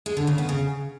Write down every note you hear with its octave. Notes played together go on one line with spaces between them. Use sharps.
G#3
D3
C#3
B3
C#3